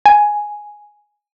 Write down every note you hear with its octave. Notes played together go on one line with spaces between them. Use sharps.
G#5